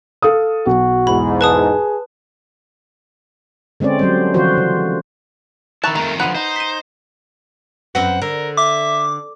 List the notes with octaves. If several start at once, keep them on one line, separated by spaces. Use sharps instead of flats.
A4 F5 D#6
B1 F#4
E2 G#2 B5
G#4 B4 A5 D#6
D3 G#3 C4 C#4 D5
F#3 G3 C5
D3 E3 F3 F4 F#4 C5
C#3
D#3 E4 A5 A#5 C#6 F#6
F2 D#3 A3 A#4 A#5
D3 F3 B4 F#5 D#7
D#4 C5
B6 D#7
F#2 C4 B4 F#5
D3 A#4
E5 D6